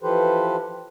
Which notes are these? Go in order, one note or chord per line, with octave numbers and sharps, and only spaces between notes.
E3 F3 G4 A4 B4 C5